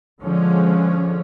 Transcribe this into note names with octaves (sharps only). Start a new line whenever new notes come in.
D3 F3 G#3 C#4